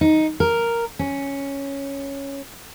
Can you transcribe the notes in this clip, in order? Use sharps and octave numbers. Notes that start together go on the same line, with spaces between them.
D#4
A#4
C#4